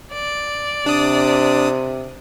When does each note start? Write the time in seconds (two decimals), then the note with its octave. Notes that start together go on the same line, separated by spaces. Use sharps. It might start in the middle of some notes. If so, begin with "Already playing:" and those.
0.11 D5
0.86 C3 D4 D#6